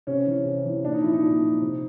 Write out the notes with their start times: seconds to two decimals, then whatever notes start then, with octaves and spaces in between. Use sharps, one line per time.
0.07 C3 C#4
0.27 E3
0.45 C3
0.65 E3
0.84 A#2 D4
0.94 D#4
1.03 F3 E4
1.13 D#4
1.23 A#2
1.42 F3
1.61 C3